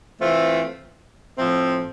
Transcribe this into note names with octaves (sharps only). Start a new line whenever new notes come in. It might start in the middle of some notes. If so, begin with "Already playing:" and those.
E3 A3 C4 F4
A2 F3 C4